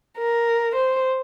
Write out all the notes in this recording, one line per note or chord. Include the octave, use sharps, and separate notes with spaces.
A#4
C5